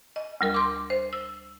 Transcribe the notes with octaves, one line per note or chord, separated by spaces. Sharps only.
D#5
D2 G3 A#4
C6 D6
C5
E6